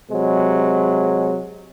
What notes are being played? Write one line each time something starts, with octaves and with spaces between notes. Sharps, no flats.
C3 F#3 G#3